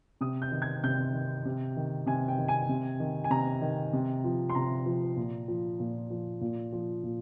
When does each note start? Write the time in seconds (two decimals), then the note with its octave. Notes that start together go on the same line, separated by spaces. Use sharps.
0.21 C3 D#6
0.42 G6
0.52 D#3
0.62 G#6
0.84 C3 G6
1.13 D#3
1.45 C3
1.77 D#3
2.06 C3 G#5
2.28 G5
2.38 D#3
2.48 G#5
2.69 C3
3.00 D#3
3.24 G#5
3.30 C3 A#5
3.62 D#3
3.93 C3
4.24 F3
4.49 C6
4.55 C3 A#5
4.86 F3
5.17 A#2
5.48 F3
5.80 A#2
6.10 F3
6.41 A#2
6.73 F3
7.04 A#2